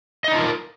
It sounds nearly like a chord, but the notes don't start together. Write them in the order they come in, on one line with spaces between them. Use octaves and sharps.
D#5 D#4 D4 F4 A#4